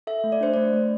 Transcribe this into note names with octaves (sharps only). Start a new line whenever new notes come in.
A4 E5
A3
D5
D4 C5
A3 D5
A3